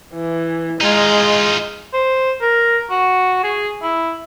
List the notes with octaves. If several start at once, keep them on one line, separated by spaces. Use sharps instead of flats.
E3
G#3 D#4 F4
C5
A#4
F#4
G#4
E4